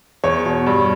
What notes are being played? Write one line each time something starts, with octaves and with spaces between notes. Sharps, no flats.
E2 C#5
B2
G2